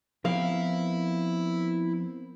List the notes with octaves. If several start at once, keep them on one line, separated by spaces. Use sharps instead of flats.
F3 B3 C4 E4 A#4 F5 G5